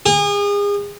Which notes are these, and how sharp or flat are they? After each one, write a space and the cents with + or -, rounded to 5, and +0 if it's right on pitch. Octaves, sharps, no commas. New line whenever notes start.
G#4 -35